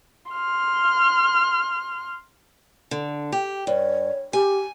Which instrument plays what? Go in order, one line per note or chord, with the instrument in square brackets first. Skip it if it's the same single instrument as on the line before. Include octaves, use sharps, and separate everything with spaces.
[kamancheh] C6 F6
[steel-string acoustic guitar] D3
G4
[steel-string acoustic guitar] G2 [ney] C#5
[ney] G4 [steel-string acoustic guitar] G#5